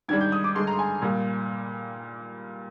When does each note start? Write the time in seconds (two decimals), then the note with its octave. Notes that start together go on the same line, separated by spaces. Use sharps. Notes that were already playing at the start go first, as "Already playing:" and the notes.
0.09 G#2 D#3 G3 D4 G#6
0.21 G6
0.32 D#6
0.44 D6
0.55 G2 D3 G#3 C6
0.67 A#5
0.79 G#5
1.02 A#2 G3 A#3